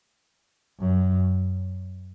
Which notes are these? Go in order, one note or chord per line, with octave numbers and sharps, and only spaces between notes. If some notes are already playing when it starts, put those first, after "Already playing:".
F#2